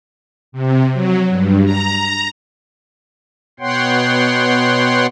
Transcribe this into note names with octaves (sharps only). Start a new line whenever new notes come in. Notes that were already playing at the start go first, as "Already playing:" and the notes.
C3
F#3
G2
A#5
B2 B3 C#5 F#5 G5 C6